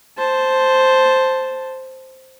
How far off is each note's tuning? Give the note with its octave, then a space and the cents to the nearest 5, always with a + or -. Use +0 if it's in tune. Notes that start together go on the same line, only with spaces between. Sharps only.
C5 +0 A5 +0